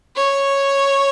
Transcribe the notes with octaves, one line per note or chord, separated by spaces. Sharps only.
C#5